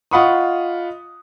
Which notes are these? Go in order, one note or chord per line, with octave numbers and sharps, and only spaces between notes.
F4 D#5 F#5 B5 C#6 D#6